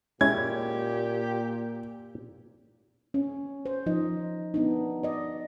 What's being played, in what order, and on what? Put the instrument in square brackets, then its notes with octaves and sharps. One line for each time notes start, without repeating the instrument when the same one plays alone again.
[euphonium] A#2 [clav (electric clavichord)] G#3 C#4 E4 [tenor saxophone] G4 [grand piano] G#6
[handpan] C#4
C5
F3 D#4 D#5
B3 D4 D#4
D5 D#5